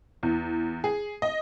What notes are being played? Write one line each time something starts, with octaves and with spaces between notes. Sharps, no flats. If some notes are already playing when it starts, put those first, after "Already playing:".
E2
G#4
D#5